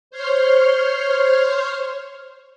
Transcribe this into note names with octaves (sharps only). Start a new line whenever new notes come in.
C5 C#5 C6 F6